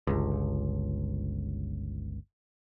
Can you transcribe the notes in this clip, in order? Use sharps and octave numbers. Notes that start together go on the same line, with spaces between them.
G1 C#2